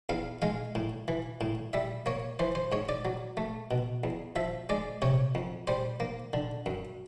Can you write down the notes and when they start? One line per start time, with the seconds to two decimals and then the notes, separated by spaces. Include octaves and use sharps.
0.09 E2 F5
0.42 G#3 F5
0.75 A2
1.08 E3
1.41 A2
1.73 G3 E5
2.06 A#3 C#5
2.39 E3 C5
2.55 C5
2.72 G#2 C#5
2.89 D5
3.05 F#3
3.37 A3
3.71 B2
4.04 E2
4.36 F3 E5
4.69 G#3 D5
5.02 C3 C#5
5.35 F2
5.67 G3 C5
6.00 A#3
6.33 D3
6.66 F#2